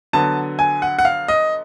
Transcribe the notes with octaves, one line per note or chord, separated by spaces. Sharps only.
D3 F#3 B3 A5
G#5
F#5
F#5
F5
D#5